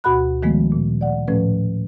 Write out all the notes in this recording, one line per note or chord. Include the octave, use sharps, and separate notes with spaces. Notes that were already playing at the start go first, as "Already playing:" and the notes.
D2 B2 F#4 F#5 B5 F#6
D#3 F3 G#3 A3 B3
A#2
D5 F#5
A2 F3 A3 C#4 B4